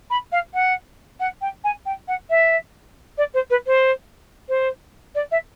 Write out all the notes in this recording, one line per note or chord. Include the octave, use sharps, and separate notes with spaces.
B5
F5
F#5
F#5
G5
G#5
G5
F#5
E5
D5
C5
B4
C5
C5
D5
E5